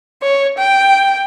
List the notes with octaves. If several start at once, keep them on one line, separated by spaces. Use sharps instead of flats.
C#5
G5